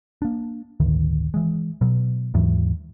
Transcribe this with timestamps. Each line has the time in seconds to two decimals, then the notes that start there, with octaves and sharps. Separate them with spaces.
0.22 A#3 D4
0.80 D1 G1 D2 D#3
1.34 E3 G#3
1.81 B2 F#3
2.34 D#2 G#2 E3 F#3